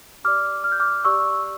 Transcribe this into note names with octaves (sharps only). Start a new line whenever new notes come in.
G4 D5 D6 F6
F6
G6
D6 F6
G4 D5 C#6 E6